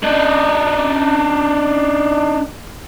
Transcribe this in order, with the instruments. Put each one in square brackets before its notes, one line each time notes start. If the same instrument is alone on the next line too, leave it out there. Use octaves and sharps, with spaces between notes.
[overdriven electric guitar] D4 D#4